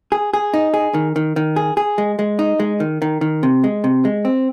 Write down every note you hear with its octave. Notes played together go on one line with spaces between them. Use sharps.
G#4
G#4
D#4
G#4
D#3
D#3
D#3
G#4
G#4
G#3
G#3
D#4
G#3
D#3
D#3
D#3
C3
G#3
C3
G#3
C4